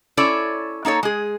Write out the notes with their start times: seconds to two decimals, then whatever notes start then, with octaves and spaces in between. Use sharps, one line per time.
0.17 C#4 E4 A4 C#5 D5
0.85 A#3 D#4 A4 C#5
1.03 G#3 G#4